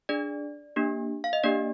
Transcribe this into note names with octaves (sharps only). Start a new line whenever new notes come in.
D4 G#4 D5
A#3 D4 G4
F5
D#5
A#3 D4 G4 D5